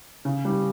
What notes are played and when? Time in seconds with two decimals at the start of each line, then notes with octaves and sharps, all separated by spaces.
0.25 C#3
0.45 G3